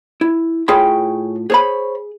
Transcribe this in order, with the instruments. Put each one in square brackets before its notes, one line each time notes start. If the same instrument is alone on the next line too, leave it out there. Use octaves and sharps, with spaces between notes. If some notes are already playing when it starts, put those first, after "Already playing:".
[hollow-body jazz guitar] E4
[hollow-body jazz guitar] A2 F4 B5 [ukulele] G#4 C#5 G5
[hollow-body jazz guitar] G#4 [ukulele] C5 C#5 B5